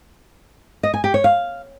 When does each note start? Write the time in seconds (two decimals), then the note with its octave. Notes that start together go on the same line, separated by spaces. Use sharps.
0.83 D#5
0.94 G#5
1.04 G4
1.14 C#5
1.24 F5